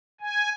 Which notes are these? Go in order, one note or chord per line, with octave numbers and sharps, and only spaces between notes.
G#5